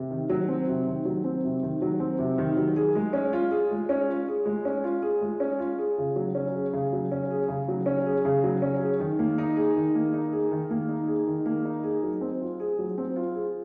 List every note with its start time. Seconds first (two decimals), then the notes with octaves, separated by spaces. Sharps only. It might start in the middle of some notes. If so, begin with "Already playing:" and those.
Already playing: C3
0.11 D#3
0.29 F#3
0.48 C4
0.68 C3
0.87 D#3
1.05 F#3
1.24 C4
1.44 C3
1.63 D#3
1.82 F#3
2.00 C4
2.19 C3
2.38 D#3
2.57 F#3
2.76 G#4
2.95 G#3
3.13 C#4
3.33 F4
3.51 G#4
3.71 G#3
3.89 C#4
4.09 F4
4.28 G#4
4.46 G#3
4.65 C#4
4.84 F4
5.02 G#4
5.21 G#3
5.40 C#4
5.59 F4
5.78 G#4
5.98 C#3
6.16 F#3
6.35 C#4
6.54 G#4
6.73 C#3
6.93 F#3
7.11 C#4
7.30 G#4
7.48 C#3
7.68 F#3
7.86 C#4
8.06 G#4
8.25 C#3
8.44 F#3
8.62 C#4
8.81 G#4
9.00 D#3
9.19 A#3
9.38 D#4
9.57 G#4
9.76 D#3
9.95 A#3
10.13 D#4
10.33 G#4
10.51 D#3
10.70 A#3
10.89 D#4
11.07 G#4
11.27 D#3
11.46 A#3
11.65 D#4
11.84 G#4
12.03 F#3
12.21 C4
12.41 F4
12.60 G#4
12.79 F#3
12.98 C4
13.16 F4
13.35 G#4